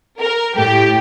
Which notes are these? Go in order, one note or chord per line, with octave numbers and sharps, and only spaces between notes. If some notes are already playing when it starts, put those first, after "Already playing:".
A#4
A2 G4